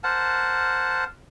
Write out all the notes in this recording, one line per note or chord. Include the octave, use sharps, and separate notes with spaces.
A#4 C5 F#5 A5